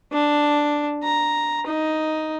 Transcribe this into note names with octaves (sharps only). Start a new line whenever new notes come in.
D4
A#5
D#4